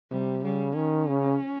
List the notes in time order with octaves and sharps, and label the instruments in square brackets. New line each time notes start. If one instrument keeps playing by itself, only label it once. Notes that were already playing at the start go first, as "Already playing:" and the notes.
[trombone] C3 [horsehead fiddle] G3
[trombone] C#3 [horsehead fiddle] G3
[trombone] D#3 [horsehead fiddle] C#4
[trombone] C#3